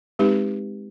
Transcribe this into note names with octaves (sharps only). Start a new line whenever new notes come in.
G#3 C4 D#4 G4 B4